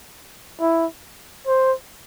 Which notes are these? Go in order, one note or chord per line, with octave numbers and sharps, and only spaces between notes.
E4
C5